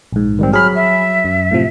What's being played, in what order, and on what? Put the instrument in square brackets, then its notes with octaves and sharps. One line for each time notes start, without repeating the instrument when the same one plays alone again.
[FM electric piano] A#1 G#2
[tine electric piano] D#3 G3 C4
[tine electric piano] F#3 [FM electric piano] G#4 B5 [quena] F6
[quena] E5
[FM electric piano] F#2
A2 C3 F3